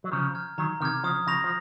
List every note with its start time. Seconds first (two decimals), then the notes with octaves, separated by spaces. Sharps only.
0.04 F#3
0.12 C#3 F3 A#5
0.35 F6 G#6
0.58 D#3 F#3 A#5
0.81 C3 D#3 F6
0.85 G#6
1.04 C#3 F3 D#6
1.27 C#3 F3 A#6 F7
1.44 F3